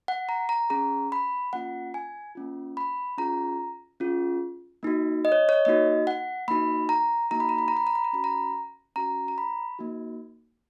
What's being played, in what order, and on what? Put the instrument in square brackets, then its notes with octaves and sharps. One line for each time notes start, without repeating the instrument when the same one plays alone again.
[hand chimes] F#5
A#5
A#5
C#4 G#4 A#5
B5
A#3 C#4 F4 F#5
G#5
A#3 C#4 F4
B5
C#4 F4 G#4 A#5
C#4 F4 G#4
A#3 D#4 F#4
D#5
C#5
C#5
A#3 D#4 F#4 D#5
F#5
A#3 D#4 F#4 B5
A#5
A#3 D#4 F#4 A#5
B5
A#5
B5
A#5
B5
A#5
B5
A#5
C#4 F#4 B5
A#5
C#4 F#4 A#5
A#5
B5
A#3 D#4 F#4